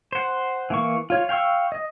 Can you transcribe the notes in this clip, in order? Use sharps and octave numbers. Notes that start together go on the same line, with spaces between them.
C5 F#5
E3 A#3 C#6
F4 C#5
F5 G5 C#6 E6
D#5